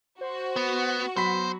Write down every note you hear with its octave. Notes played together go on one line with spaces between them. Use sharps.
F#4 C5
B3
F#3 B3 C5 B5 B6